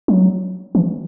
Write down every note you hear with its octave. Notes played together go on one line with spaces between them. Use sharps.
F#3
E3